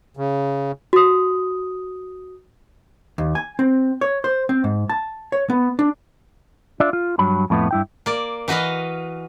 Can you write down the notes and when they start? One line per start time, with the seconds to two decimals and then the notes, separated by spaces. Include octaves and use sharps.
0.17 C#3
0.93 F#4 D#6
3.18 D#2
3.35 G#5
3.59 C4
4.01 C#5
4.24 C5
4.49 C4
4.64 G#2
4.89 A5
5.32 C#5
5.50 B3
5.79 D4
6.80 D4 F4 D5 E5
6.93 F4
7.19 G2 F#3 B5
7.50 F2 A2 A3 B3
7.71 G2 E4 G5
8.06 A#3 D5
8.48 E3 F#4 B4 D#5 F5